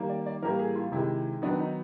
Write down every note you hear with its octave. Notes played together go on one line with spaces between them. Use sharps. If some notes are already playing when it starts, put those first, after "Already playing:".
Already playing: D#3 G3 A#3
D5
D5
A2 E3 G3 A#3 A#4
G#4
F4
C3 D#3 G#3 E4
D#3 F#3 B3 D4
D#4